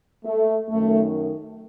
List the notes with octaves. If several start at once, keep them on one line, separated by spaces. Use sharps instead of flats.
A3
F#2 D#3 A3